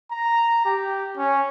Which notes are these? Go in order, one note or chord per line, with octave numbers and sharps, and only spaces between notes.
A#5
G4
C#4